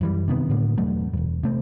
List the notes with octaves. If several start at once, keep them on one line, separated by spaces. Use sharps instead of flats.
F#2 E3 G3
C3 D#3 B3
A2 D3 A#3
E1 G2 F#3 A3
E1 F#2
C3 A3 C4